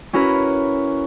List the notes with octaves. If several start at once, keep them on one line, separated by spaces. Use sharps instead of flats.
C#4 E4 F#4 A#4 B4